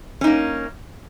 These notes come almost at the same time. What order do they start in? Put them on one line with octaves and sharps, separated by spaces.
C#4 D#4 A#3